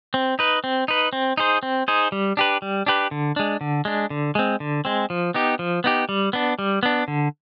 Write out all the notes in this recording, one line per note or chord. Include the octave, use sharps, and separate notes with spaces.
C4
D#4 B4
C4
D#4 B4
C4
D#4 G#4 C5
C4
D#4 G#4 C5
G3
D4 G4 B4
G3
D4 G4 B4
D3
G#3 D4
D3
G#3 D4
D3
G#3 C4
D3
G#3 C4
F3
B3 D#4 G4
F3
B3 D#4 G4
G3
B3 D4
G3
B3 D4
D3